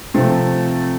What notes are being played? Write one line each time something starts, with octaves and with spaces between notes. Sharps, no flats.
C3 F3 A3 C4